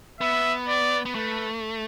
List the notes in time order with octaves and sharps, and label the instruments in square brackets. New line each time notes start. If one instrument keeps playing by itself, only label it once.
[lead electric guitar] B3 [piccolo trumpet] E5
[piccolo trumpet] D5
[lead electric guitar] B3
[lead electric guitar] A3 [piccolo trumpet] B4